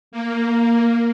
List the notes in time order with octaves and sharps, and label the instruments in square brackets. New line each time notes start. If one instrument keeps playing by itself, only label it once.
[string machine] A#3